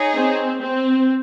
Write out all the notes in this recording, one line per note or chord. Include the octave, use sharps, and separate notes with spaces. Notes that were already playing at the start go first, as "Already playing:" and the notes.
Already playing: D#4 G#4 C#5
C4
C4